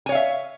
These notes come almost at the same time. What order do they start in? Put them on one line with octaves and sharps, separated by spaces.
G#5 C#5 F5 E5